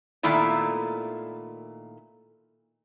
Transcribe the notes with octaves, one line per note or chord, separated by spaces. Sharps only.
A#2 D#3 A3 B3 E4 D5